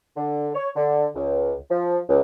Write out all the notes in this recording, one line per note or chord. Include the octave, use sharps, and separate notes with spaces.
D3
C#5
D3
C#2
F3
C#2